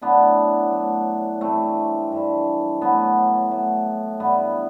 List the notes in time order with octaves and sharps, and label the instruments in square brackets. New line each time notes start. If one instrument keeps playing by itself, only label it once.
[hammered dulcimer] A2 F#3 B3 D4
A2 F#3
G2 E3 A3 C4
G2 E3
A2 F#3 B3
A2 F#3
G2 E3 B3